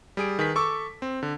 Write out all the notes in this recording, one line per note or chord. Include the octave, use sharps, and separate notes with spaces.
G3 G#4 D7
D#3 G#4 B4 B6
A4 C#6 D6 E6
C4
D3